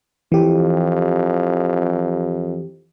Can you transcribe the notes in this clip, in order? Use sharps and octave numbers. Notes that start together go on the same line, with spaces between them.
F2 E3 G4